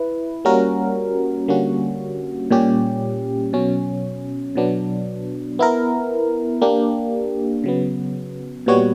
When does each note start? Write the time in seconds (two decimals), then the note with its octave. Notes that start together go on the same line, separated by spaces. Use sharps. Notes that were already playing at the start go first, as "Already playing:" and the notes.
Already playing: E4 B4
0.45 G3 A#3 C#4 F#4 A#4
1.48 D3 G3 A#3 C#4 F#4
2.51 A#2 G3 C#4 G4
3.53 B2 F#3 C#4
4.55 B2 F#3 B3 D4
5.59 B3 E4 A#4
6.62 A#3 D4 G4
7.64 C#3 F#3 B3
8.66 A#2 G3 B3 F#4 C#5